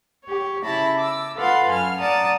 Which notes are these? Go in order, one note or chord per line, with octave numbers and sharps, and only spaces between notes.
G4 C#5
C#3 E4 A5 B5 A#6
D6 E6
F4 A4 B4 F5 F#5 C6
F#2 G#5 F6
D5 F#5 A5 A#5 D#6